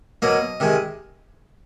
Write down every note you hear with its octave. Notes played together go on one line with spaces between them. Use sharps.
B2 F#3 A#3 D#5
C3 D#3 G#3